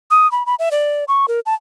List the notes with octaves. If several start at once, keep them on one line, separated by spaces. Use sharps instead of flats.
D#6
B5
B5
E5
D5
C#6
A#4
A5